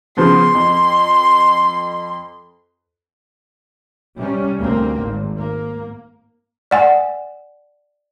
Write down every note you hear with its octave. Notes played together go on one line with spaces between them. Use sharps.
C#3 F3 B3 C6
F2
C3 G3 C#4
D2 A#3 C4
G#1
A#3
D5 F#5 G#5